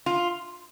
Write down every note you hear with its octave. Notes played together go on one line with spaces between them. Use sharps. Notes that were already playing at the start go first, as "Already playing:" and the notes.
F4